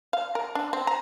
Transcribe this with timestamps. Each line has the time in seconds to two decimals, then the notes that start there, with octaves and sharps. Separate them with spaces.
0.13 F5
0.35 A#4
0.55 D4
0.73 C4
0.87 A#5